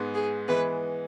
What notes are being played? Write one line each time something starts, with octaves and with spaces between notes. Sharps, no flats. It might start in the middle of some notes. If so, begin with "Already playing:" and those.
Already playing: G#2 G#3 B3
G#4
E3 G#3 B3 B4